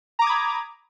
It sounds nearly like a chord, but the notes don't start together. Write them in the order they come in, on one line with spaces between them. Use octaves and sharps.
A#5 D6 D#6 G#6 B5